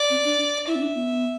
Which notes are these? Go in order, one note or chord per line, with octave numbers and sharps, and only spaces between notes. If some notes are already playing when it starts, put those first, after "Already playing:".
Already playing: D5
C4
D4
E4 E5
C4
D4
B3